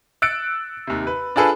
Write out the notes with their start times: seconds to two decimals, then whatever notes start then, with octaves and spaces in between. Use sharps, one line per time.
0.22 E6 F#6 A6 C#7 D7
0.87 D#2 C3
1.07 B4
1.36 D4 F4 G#4 A4 B4